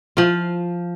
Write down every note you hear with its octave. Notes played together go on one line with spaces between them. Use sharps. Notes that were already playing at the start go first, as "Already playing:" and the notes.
F3 F4